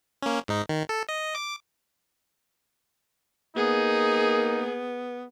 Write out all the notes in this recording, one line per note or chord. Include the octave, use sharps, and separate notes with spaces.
A#3 C#4
G#2 D#4
D#3
A4
D#5
D6
A#3 B3 D#4 G#4